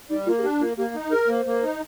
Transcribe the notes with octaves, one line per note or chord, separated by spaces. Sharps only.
G3 D#4
A#3 F4
G#4
D4 G4
A#3 F4
A#3 G4
D#4
G#4 A#4
A#3 C5
A#3
D#4